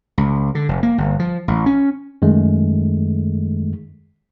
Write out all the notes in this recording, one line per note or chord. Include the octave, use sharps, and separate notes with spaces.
C#2
D3
F1
A#3
G1
F3
A1
C#4
F#2 D#3 G#3 A3